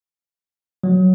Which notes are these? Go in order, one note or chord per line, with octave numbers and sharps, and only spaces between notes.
F#3